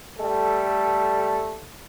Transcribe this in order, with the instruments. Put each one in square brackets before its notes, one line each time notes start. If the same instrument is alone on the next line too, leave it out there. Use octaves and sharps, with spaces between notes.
[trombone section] G3 A3 A4